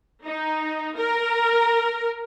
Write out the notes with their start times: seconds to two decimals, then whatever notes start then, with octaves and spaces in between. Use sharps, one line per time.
0.25 D#4
0.96 A#4